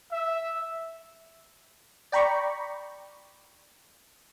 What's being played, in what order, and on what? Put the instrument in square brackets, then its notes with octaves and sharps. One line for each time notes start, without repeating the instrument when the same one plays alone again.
[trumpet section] E5
[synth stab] D5 G5 A#5 B5 C#6